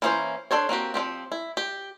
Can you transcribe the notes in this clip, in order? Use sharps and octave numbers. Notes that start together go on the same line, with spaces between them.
E3 A#3 C#4 G#4 C5
D4 A4 C5 C#5
A#3 C4 F#4 G4
F3 G3 C4 G4
E4
G4